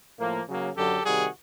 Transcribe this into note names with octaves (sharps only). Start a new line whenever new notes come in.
A2 F3 A#3
C#3 F#3 A#3
F#2 D3 F#3 G4 A4
C3 D#3 G3 F#4 G#4